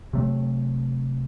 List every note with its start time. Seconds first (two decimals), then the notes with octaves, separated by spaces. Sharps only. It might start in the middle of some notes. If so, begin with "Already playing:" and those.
0.13 C3 F#3 A3